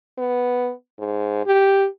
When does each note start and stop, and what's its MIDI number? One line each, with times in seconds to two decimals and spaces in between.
0.18 0.72 59
0.99 1.42 44
1.46 1.87 67